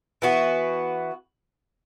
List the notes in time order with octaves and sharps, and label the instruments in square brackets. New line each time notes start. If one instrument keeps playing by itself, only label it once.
[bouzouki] E3 B3 F#4